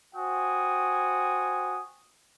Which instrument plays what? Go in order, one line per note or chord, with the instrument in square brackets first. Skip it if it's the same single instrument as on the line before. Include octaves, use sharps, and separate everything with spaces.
[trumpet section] F#4 C5 G5 G#5 D#6